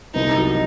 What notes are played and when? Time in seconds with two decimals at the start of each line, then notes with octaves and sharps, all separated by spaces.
0.14 C2 D#4
0.37 F#3